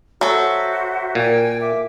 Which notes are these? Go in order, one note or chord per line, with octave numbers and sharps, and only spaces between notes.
F#3 F#4 A4 C5 E5
A#2 G5 G#5
E5 D6